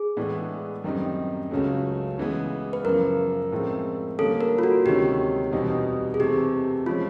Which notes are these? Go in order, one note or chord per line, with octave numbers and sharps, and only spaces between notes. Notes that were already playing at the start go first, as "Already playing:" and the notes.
Already playing: G#4
A2 E3 G#3 B3 D4
F#2 D#3 G3 C4 D#4
C#2 C#3 F#3 A3
C#3 E3 G#3 B3
B4
F#2 C#3 F3 A#4
A2 F3 G#3 C4
D3 G3 A#3 C#4 A4
A#4
F4
F#4
D2 C3 D#3 G#3 C#4 G4
E2 B2 G3 C4 D#4
G#4
C3 E3 A3 C4 G4
F3 G#3 C#4 F4